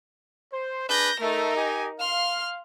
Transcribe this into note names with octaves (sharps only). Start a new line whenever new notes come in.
C5
D4 G#4 B4 G6 A#6
A3 D#4 A#4
G4 D#5 G#5
F5 C6 F6